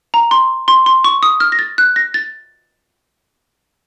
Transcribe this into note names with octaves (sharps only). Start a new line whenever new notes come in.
A#5
C6
C6
C6
C#6
D#6
F6
A#6
A6
F#6
A#6
A6